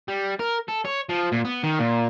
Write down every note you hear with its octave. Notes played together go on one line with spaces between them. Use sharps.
G3
A#4
A4
C#5
F3
A#2
B3
D#3
A#2